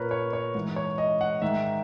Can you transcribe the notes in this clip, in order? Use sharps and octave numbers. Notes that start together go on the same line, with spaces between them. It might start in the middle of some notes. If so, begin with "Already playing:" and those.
Already playing: A#2 A#4 B4 C#5
C#5
C#5
G#2 E3
C#5
D#5
F#5
G#2 D#3 E5